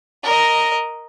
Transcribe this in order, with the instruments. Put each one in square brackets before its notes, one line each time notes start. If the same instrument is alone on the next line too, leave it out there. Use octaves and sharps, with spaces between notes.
[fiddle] A#4 D#5